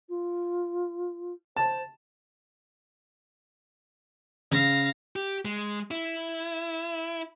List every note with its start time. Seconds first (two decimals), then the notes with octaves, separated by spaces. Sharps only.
0.09 F4
1.56 C5 A5
4.51 C#3 F5 A#6
5.16 G4
5.45 G#3
5.91 E4